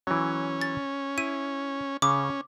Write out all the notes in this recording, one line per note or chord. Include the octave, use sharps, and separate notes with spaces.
E3 F#3 C#4
A6
E4 D#7
C#3 C#4 D6